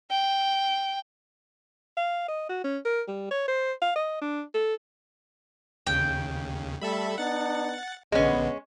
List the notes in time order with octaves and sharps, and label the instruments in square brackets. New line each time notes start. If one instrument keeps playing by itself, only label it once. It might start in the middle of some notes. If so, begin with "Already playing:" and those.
[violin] G5
[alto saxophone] F5
D#5
F#4
C#4
A#4
G3
C#5
C5
F5
D#5
D4
A4
[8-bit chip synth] D#2 C#3 [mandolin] G5
[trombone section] G3 A3 [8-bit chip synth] A4 E5 B5
[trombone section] B3 D4 D#4 [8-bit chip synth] F#5 A6
[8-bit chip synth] A#1 D3 [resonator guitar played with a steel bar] G#3 C#4 [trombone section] B3